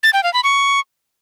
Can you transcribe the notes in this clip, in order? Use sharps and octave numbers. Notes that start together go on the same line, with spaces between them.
A6
G5
F5
B5
C#6